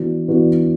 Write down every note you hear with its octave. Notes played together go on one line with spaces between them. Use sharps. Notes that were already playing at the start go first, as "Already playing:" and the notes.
Already playing: E3 B3 D4 F#4
E3 B3 D4 F#4